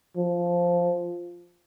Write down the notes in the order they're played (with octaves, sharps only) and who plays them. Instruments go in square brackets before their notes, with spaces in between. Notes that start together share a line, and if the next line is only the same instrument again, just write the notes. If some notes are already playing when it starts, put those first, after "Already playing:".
[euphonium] F3